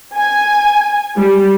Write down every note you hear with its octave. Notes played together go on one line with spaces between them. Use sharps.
G#5
G3